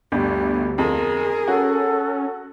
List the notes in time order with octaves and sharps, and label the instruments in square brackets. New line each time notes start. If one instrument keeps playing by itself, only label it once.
[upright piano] G1 [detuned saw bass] D2 [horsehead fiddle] G3 A3
[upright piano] F2 [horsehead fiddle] G#4 A#4
[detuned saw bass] C#4 [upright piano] F#4 [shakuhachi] A4